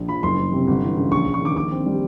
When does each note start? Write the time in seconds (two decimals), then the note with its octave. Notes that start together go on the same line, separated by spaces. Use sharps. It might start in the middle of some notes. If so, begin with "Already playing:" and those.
Already playing: A#1
0.09 F3 B5
0.23 F#1 C6
0.38 F#1
0.52 C3
0.67 G1
0.82 E3
0.97 C#3
1.12 A#1 C#6
1.26 A#1
1.34 C#6
1.41 D#3 D6
1.56 A#1 D6
1.71 C4
1.86 G3